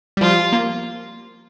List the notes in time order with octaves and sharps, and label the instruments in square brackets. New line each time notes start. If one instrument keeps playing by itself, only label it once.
[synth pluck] G3
[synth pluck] F3 [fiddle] F4
[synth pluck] A#3